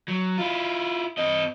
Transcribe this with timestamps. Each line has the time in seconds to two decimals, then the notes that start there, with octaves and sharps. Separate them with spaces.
0.08 F#3
0.38 E4 F4
1.17 C4 D#5